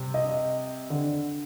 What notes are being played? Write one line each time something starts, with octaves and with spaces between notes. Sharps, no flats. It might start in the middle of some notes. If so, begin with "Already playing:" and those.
Already playing: C3 G3 C4
D#5
D3